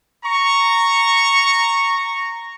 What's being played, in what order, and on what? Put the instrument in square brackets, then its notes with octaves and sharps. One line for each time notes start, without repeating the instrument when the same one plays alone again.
[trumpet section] A#5 C#6